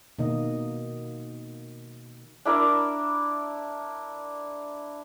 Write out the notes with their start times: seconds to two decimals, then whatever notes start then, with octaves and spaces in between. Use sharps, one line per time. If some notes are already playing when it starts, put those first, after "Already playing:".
0.18 B2 D#3 A#3 D#5
2.45 D4 E4 A#4 D5